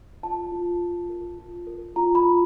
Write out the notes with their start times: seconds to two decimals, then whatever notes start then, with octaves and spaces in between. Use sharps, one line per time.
0.23 F4 A5
0.52 F4
0.81 F4
1.10 A#4
1.39 F4
1.67 A#4
1.96 F4 A#5
2.15 B5
2.25 F4